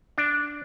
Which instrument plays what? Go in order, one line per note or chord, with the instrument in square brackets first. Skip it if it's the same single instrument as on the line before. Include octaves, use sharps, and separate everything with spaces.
[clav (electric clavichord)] D4